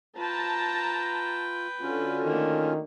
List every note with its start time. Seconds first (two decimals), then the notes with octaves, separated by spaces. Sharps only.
0.17 F4 B4 G5 A5 A#5
1.81 D3 C#4 F4 F#4
2.25 D#3 A3 A#3